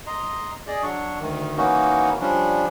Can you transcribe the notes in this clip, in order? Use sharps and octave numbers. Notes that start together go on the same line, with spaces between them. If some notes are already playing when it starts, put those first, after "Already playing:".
D#5 A#5 C6
G#4 D5 D#5
F#3 D4 C#6
D2 D#3
E3 A#3 C#4 D#4 F#4
F3 G3 C#4 D4